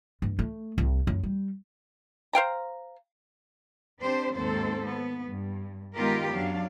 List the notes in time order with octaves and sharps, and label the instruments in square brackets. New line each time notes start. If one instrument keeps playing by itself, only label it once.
[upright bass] G2
A3
C2
F#2
G3
[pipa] C5 F5 G5 A#5
[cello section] C4 D4 G4 C5
D#2 G#2 C4 A4 C5
B3
G2
D#3 G#3 B3 F4 G4 A#4
F#2 F#3 D4 F5